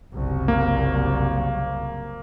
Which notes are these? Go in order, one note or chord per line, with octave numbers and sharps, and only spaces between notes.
F#1 C2
A#3